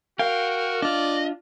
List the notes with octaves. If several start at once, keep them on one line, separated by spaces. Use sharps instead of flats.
F#4 A#4 F5 G5
D4 F4 D5 D#5